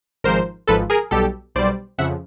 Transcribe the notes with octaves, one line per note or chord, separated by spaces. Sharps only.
G#1 G#2 F3 A#4 C5
G#1 G#2 F3 A4 B4
G#4 A#4
B1 B2 G3 G4 A4
B1 B2 G3 C5 D5
F2 C#3 F3 E5 F#5